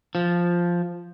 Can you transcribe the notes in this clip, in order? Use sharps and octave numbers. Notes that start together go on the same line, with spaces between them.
F3